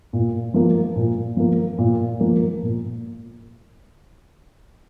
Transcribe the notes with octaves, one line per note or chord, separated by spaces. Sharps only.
A#2
F3 A#3
A#2
F3 A#3
A#2
F3 A#3
A#2